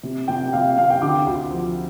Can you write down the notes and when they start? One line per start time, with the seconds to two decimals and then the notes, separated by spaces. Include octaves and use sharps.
0.03 C3
0.28 C3 G5
0.53 C3 F5
0.65 F5
0.77 C3 F5
0.90 G5
1.02 D3 D6
1.26 D2
1.51 F3